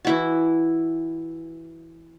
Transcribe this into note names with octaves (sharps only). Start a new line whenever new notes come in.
E3 E4 F#4